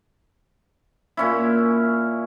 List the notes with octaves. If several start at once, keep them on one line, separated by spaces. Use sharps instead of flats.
A#2 C#4 E4